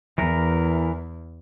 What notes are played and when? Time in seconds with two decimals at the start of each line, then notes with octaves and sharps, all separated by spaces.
0.18 E2 E3 A#4